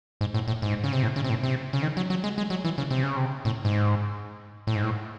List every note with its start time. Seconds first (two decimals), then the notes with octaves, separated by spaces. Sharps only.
0.21 G#2
0.34 A2
0.48 A2
0.62 G#2
0.84 C#3
0.92 C3
1.03 A2
1.16 C#3
1.24 C3
1.30 A2
1.43 C3
1.73 C#3
1.83 D#3
1.97 F#3
2.10 F#3
2.24 G#3
2.38 G#3
2.50 F#3
2.65 E3
2.78 C#3
2.91 C3
3.03 C#3
3.16 C3
3.45 A2
3.65 G#2
4.67 A2
4.75 G#2
4.83 A2